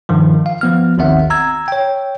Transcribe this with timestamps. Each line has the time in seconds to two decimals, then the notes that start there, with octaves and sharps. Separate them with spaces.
0.09 G2 D#3 F3
0.46 F5
0.61 F3 B3 F6
0.98 G#1 D#2 D#3 C4 E5 F#5
1.30 A#5 E6 G#6
1.68 C#5 G5